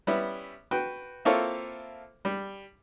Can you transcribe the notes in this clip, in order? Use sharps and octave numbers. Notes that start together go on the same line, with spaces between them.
G3 B3 C#4 E4
F#4 B4 G5
A#3 C4 E4 F4 A4 C#5
G3